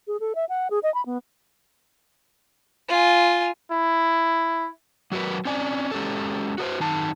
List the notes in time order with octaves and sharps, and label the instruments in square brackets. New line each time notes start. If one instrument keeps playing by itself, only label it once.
[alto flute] G#4
A4
E5
F#5
G#4
D#5
B5
B3
[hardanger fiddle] F4 G#5
[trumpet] E4
[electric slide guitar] F#3 F#4 A#4 B4
C4 C#4 D5 G#5
G#3 C#4 G4 A4
F#4 A4 B4 C5
F#2 D#3 D#4 A5